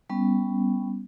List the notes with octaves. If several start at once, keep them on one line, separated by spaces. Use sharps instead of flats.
G3 B3 C#4